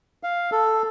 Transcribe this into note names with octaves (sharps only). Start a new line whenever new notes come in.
F5
A4